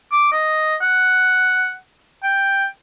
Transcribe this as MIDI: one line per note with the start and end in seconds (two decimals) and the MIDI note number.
0.12 0.30 86
0.32 0.76 75
0.81 1.73 78
2.24 2.66 79